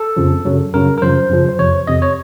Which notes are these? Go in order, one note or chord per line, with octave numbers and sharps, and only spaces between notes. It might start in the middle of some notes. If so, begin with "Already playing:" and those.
Already playing: A4
F2 C#3 F3
F#2 C#3 F#3
F#2 C#3 F#3 A#4
A#4
F#2 C#3 F3 C5
F#2 C#3 F3
C5
F2 C3 F3 C#5
F2 C3 F3 D#5
C#5